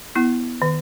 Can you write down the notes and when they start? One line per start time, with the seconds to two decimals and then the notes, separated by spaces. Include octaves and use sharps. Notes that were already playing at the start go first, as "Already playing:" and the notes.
0.15 B3 E4
0.62 D#3